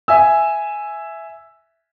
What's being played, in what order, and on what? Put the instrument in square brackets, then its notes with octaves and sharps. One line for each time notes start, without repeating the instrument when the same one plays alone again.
[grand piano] E5 G#5 E6